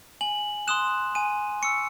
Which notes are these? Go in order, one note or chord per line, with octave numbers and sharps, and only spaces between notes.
G#5 F#7
C6 D#6 F#6 E7
G#5 D#7
C#6 E6 C#7